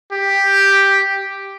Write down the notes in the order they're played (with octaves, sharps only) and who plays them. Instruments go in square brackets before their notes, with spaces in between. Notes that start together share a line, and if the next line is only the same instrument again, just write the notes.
[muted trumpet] G4